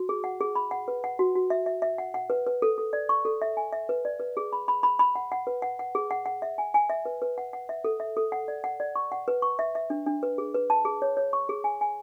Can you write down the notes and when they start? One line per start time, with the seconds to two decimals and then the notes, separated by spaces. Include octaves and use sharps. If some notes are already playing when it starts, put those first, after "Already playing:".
Already playing: F#4
0.09 G#4
0.24 F#5
0.41 G#4
0.55 B5
0.71 F#5
0.88 B4
1.04 F#5
1.19 F#4
1.35 F#4
1.50 E5
1.66 E5
1.82 E5
1.98 F#5
2.14 F#5
2.30 B4
2.47 B4
2.62 A4
2.78 A4
2.93 D5
3.09 C#6
3.25 A4
3.42 E5
3.57 G#5
3.73 E5
3.89 B4
4.05 D5
4.20 B4
4.37 G#4
4.53 B5
4.68 B5
4.83 B5
4.99 B5
5.15 F#5
5.32 F#5
5.47 B4
5.62 F#5
5.79 F#5
5.95 G#4
6.11 F#5
6.26 F#5
6.42 E5
6.58 G#5
6.74 G#5
6.90 E5
7.05 B4
7.22 B4
7.38 F#5
7.53 F#5
7.69 E5
7.84 A4
8.00 E5
8.17 A4
8.32 F#5
8.48 D5
8.64 F#5
8.80 D5
8.96 C#6
9.12 F#5
9.28 B4
9.42 C#6
9.59 E5
9.75 E5
9.90 D4
10.06 D4
10.23 B4
10.38 G#4
10.54 B4
10.70 A5
10.85 G#4
11.02 C#5
11.17 C#5
11.33 C#6
11.49 G#4
11.64 G#5
11.81 G#5